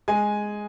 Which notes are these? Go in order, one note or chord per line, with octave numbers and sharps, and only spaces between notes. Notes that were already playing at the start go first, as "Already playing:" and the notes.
G#3 G#5